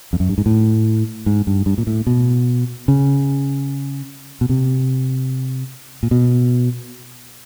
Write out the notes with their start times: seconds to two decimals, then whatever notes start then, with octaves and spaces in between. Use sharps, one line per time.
0.13 F2
0.20 F#2
0.29 G2
0.38 G#2
0.46 A2
1.26 G#2
1.47 G2
1.66 G2
1.78 A#2
1.87 A2
2.07 B2
2.88 C#3
4.41 B2
4.49 C3
6.03 A#2
6.11 B2